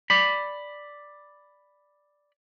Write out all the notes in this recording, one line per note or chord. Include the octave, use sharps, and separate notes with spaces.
D5 B5